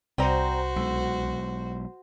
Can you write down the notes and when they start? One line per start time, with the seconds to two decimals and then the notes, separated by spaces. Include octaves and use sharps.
0.18 C2 C4 F#4 C5 D5 A#5
0.76 B1 G#3 A4